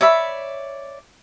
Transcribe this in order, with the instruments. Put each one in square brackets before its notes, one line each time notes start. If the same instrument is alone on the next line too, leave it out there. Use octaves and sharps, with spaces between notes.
[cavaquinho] C#5 D5 E5 B5